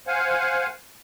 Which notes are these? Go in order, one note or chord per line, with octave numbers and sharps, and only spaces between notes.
C5 F5 F#5 G#5